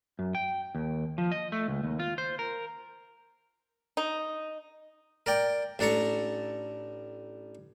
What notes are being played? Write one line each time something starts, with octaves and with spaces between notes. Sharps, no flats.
F#2
G5
D#2
F3
D#5
A3
C#2
D#2
F4
C5
A#4
D#4
A#4 D5 G5
A1 D4 A4 A#5 C#6